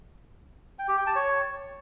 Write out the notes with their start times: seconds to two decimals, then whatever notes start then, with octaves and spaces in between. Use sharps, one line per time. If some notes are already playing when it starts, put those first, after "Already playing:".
0.79 G5
0.88 G4
0.97 G5
1.07 A5
1.16 C#5